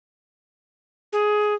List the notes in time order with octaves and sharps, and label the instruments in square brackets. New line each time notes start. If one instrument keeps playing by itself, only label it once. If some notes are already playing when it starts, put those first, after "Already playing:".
[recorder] G#4